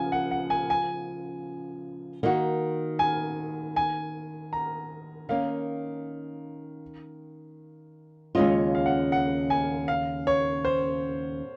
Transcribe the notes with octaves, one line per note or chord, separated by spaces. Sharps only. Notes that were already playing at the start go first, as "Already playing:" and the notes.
Already playing: C#3 F3 G#5
F#5
F#5
G#5
G#5
D#3 A#3 D#4 F#4
G#5
G#5
A#5
D#3 A#3 C#4 F5
D#2 C#3 G#3 C#4 F4 D#5
F5
F#5
F#5
G#5
F5
C#5
C5